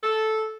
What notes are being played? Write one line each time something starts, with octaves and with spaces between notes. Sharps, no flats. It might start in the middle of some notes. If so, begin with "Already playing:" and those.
A4